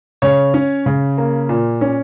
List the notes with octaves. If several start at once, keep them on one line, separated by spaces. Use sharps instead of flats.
C#3 C#5
C#4
C#3
A#3
A#2
C#4